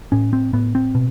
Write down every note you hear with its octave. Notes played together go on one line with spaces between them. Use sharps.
A2 C#4
C4
A2 B3
C4
B2